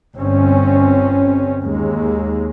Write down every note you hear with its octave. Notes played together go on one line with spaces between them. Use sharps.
G1 C4 C#4
D#2 G#3